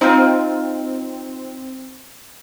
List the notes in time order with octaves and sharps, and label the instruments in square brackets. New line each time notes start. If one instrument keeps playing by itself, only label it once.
[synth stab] C4 [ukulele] D#4 F4